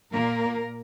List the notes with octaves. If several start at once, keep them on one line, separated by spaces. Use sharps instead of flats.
A#2 A#3 A#4